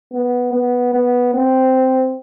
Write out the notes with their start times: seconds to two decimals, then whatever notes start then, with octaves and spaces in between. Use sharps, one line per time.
0.13 B3
0.53 B3
0.94 B3
1.34 C4